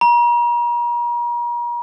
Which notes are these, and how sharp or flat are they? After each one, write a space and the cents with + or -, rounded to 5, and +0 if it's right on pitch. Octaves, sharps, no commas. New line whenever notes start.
A#5 +40